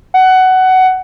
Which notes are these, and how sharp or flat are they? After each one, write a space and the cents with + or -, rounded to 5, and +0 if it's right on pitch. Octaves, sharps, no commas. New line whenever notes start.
F#5 +15